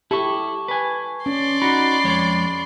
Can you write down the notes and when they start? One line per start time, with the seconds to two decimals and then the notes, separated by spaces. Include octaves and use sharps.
0.11 E4 G4 A4 A5 C#6
0.68 B4 G#5
1.26 C#4 D5 C6
1.62 D#4 F#4 B5
2.04 F2 G#3 C#5